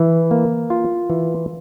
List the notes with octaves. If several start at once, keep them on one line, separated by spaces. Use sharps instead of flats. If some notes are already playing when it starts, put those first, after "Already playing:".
Already playing: E3
A#3
F4
E3